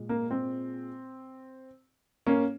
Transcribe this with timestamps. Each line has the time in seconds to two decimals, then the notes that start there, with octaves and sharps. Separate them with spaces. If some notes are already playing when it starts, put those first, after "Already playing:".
Already playing: A#2 G#3
0.09 A#3
0.31 C4
2.27 A#3 C#4